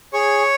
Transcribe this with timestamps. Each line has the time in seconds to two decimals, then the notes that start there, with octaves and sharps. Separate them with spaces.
0.13 G#4 C#5 C#6